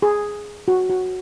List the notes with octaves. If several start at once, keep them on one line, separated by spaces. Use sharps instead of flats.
G#4
F#4
F#4